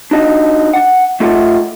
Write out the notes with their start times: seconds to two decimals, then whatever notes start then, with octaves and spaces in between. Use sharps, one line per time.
0.11 D4 D#4 F#4 D#5
0.74 F#5
1.20 A3 F4 A4 D#5 F5 F#5